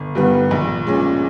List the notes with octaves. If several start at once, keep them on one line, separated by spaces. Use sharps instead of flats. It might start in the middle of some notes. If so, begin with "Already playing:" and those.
Already playing: G1
G2 D#3 G3 B3
A#1
A#2 G#3 C#4